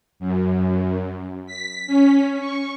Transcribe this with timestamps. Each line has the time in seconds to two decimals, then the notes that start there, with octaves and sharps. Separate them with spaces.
0.20 F#2
1.46 B6
1.87 C#4
2.40 C#6